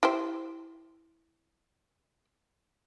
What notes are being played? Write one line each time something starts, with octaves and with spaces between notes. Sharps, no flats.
E4 G4 C5